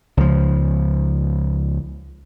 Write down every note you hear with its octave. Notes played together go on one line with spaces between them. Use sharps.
C#2 F3